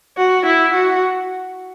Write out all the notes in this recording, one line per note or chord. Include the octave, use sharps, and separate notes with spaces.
F#4
E4
F#4